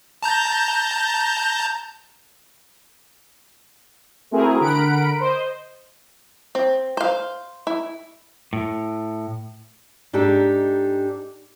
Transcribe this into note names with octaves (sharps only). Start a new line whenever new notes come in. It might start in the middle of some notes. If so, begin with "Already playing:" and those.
A5 A#5 G6
A3 C4 E4 F#4 G#4 A#4
D3 A#4 F#5 B5 D7
C5 D#5
C4
C5 F5
E4
A2
G#2 D4 D#4 G4 A4